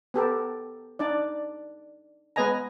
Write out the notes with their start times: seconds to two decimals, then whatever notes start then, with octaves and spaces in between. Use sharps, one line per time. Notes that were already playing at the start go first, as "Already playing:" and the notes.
0.14 B3 G4 A4 A#4
0.99 D4 D#4 D5
2.36 G#3 B3 B4 D#5 G#5 A#5